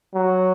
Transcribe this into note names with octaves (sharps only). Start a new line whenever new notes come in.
F#3